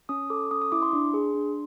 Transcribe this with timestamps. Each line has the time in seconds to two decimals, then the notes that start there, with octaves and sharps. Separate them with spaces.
0.09 C#4 D#6
0.30 A4 D6
0.51 C#4 D#6
0.62 D#6
0.72 E4 D6
0.82 C6
0.93 D4
1.14 G#4
1.35 D4